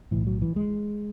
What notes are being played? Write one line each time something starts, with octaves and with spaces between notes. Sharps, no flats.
B1 A2 E3
F#3
E3
G#3